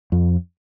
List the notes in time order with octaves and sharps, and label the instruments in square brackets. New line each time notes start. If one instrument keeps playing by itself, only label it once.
[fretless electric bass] F2